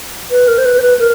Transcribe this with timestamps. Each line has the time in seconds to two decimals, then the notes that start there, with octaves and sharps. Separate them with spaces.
0.31 B4
0.48 A#4
0.58 C5
0.66 B4
0.78 C5
0.82 B4
0.99 A#4